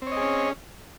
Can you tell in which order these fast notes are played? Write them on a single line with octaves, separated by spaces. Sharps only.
C4 C#5 D#5 G#4 C#4